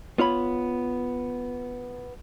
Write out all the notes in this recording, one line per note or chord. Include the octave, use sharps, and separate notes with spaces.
B3 F4 C#5 B5